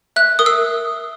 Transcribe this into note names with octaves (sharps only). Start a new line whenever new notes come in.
E5 F#6
A#4 D#6
E6